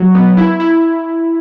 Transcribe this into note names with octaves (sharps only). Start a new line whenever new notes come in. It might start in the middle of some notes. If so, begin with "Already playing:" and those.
Already playing: F#3
B3
E4
E4